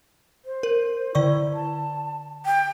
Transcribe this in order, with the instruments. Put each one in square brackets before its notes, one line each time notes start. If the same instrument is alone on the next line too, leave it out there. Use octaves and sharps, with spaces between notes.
[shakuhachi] C5
[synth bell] A#4
[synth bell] D3 D5 C#6 [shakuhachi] E4
[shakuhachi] A5
G5